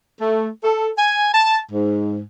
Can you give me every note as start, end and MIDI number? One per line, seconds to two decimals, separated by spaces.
0.21 0.48 57
0.64 0.90 69
0.98 1.30 80
1.34 1.60 81
1.71 2.22 44